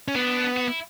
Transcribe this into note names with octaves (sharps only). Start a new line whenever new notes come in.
C#4
B3 D4
F#4
E4